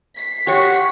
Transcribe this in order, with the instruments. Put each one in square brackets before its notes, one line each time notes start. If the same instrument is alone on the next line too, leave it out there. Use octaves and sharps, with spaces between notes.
[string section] B6 C7
[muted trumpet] F#4 [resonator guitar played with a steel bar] G4 C#5